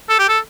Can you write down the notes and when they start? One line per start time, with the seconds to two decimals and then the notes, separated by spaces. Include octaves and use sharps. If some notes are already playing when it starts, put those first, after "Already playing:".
0.09 A4
0.19 G4
0.29 A4